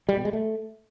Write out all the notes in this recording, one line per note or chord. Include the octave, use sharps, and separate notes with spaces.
G3
B2
G#3
A3